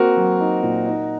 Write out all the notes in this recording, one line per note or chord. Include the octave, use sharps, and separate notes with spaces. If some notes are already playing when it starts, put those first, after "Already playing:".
Already playing: A#3 C4 F#4 A#4
F#3
D#4
A#2
D#4